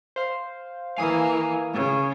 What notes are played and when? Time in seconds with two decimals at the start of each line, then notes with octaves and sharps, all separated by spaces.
0.16 C5 F5
0.97 E3 A#3 F5 G#5 D#6
1.73 C#3